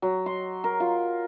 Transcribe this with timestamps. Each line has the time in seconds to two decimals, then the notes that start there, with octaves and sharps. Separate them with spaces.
0.02 F#3
0.26 C6
0.64 A#4
0.80 F4